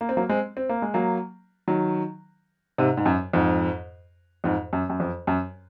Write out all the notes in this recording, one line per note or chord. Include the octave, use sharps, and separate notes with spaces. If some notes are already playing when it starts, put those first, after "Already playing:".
A#3
C4
F#3 A#3
G#3 C4
C4
A#3
G#3
F#3 A#3
D#3 F#3
G#2 C3
G#2
F#2
F2 G#2
F2 G#2
F#2
F#2
F2
F#2